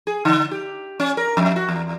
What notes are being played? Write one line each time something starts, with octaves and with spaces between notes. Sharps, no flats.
G#4
D3
G4
C#4
A#4
F2
F#4
E2